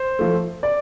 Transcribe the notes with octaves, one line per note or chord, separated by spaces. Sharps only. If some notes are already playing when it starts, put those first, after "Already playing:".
Already playing: C5
F3 A3
D5